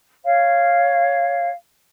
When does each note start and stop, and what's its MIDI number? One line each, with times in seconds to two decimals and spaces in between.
0.23 1.49 73
0.23 1.49 77